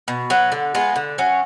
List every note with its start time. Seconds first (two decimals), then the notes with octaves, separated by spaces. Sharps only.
0.08 B2
0.30 F#3 B3
0.52 D3
0.75 G#3 B3 F4
0.96 D3
1.18 F#3 C#4